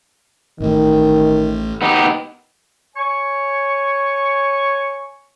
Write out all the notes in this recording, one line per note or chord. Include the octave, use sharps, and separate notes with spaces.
A1 A2 D#3
B3 D#4 G4
C#5 G#5 C#6